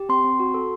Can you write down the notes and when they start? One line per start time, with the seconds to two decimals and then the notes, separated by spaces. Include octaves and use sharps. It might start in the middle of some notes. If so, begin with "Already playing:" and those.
Already playing: G4
0.09 C4 C6
0.24 C4
0.40 F#4
0.54 A4